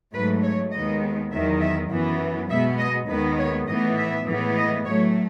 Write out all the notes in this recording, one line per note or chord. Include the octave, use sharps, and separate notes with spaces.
G#2 F#3 A3 B4
C#5
D#2 D#3 G#3 B3 D#5
E2 D#3 F#3 E5
E5
F#2 E3 B3
B2 G#3 B3 E5
D#5
D#2 D#3 G#3 B3 B4
C#5
A2 E3 B3 D#5
E5
A2 E3 G#3 B3
D#5
A2 F#3 A3 C#5